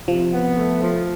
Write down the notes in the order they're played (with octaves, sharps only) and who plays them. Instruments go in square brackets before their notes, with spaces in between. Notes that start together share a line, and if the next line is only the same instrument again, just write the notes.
[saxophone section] C3 [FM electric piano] F3
[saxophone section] B3
A3
F3